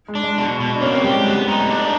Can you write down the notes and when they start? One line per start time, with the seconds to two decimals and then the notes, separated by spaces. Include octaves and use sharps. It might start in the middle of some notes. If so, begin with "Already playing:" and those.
0.08 G#3
0.15 D4
0.23 G#3
0.38 B2
0.60 B2
0.75 D4
0.81 A#3 C#4
0.92 C4
1.04 G3 G4
1.15 G#3
1.26 G#3 B3
1.37 G#3
1.47 G3 D#4
1.59 A3
1.70 D4